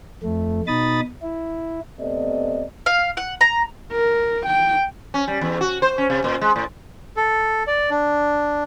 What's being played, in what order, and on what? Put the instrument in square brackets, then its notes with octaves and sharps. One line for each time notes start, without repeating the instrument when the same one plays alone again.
[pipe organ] F2 A3
B2 D#4 B5 D#6 A6
E4
[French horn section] C3 A3 B3 D5 D#5
[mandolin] F5
F#5
A#5
[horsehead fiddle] A#4
G5
[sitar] C#4
G3
E2
F#4
C5
C#4
C3
A#2
G#3
A2
[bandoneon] A4
D5
D4